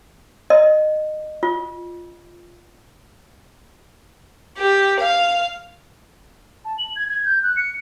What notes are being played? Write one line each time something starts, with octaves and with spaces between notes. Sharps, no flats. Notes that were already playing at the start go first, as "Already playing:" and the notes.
D#5
F4
G4
F5
A5
F#7
G#6
G#6
G6
F#6
C#7